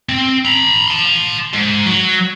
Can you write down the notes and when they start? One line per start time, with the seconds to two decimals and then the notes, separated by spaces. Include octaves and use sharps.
0.09 C4
0.45 A#5 B5
0.88 A5 C6
1.54 G#2
1.86 F#3